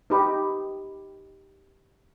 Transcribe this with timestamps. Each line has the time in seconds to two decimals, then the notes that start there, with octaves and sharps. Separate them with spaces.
0.10 D#4 G4 B4 G5 B5